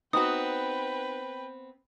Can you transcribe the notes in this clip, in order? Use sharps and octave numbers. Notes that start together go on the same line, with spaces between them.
B3 C4 D#4 F#4 B4 G5 D#6